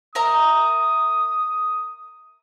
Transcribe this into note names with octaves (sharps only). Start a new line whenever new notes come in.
A#4 E5 A#5 D#6